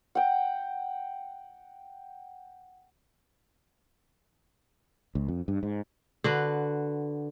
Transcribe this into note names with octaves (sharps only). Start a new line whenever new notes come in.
F#5 G5
C#2
F2
G2
G#2
D3 F#4 B4